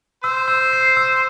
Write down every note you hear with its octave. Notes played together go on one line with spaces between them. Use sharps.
C5 E6
E6
C7
E6